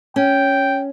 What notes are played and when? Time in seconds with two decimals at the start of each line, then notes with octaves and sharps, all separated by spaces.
0.16 C#4 G5